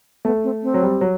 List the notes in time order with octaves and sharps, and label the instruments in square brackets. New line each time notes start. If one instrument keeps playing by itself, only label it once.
[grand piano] A3 [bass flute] B3
[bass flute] C4
C4
[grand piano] F#3
G3
F#3